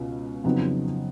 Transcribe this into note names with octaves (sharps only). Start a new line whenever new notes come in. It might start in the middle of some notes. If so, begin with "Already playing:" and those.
Already playing: C#2 B2 C#4
F2 C#3 F#3 B3 D#4